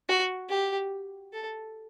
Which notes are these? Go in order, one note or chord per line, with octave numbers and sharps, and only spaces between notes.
F#4
G4
A4